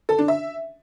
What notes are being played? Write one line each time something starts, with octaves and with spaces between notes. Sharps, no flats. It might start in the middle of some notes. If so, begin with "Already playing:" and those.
A4
D4
E5